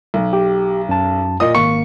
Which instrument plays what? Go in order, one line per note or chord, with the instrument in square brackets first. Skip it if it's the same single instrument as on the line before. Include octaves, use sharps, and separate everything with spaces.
[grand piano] B1
[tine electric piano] G4
F#2 A5
[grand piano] A#2 D#5 D#6
[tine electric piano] G#1 A#3 C#7 [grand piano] C#6